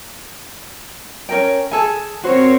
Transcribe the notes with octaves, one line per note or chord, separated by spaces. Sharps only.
C#4 A#4 G5
G#4 A4 G#5
C4 F#4 A#4 C5 C#5